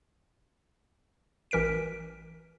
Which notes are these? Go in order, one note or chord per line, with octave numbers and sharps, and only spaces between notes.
A1 E3 A#4 B6 D7